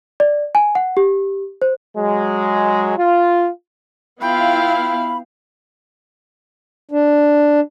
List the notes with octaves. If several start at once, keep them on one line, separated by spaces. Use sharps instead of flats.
D5
G#5
F#5
G4
C5
F#3 G#3
F4
B3 E4 F4 F5 G5 B5
D4